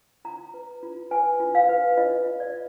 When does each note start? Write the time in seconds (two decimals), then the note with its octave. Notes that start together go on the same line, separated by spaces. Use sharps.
0.25 F4 A#5
0.54 B4
0.83 F4
1.11 B4 G#5
1.40 F4
1.55 F5
1.69 B4
1.97 F4 D#5
2.26 B4
2.40 D5